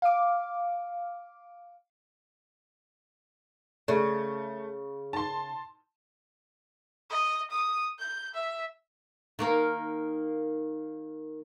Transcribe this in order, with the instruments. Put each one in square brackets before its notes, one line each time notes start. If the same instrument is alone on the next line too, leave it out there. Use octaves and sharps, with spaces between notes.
[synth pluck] F5 D6
[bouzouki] C#3 [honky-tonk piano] A3
[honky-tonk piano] A5 C6
[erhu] D#5
D#6
G6
E5
[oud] D#3 A#3 A#4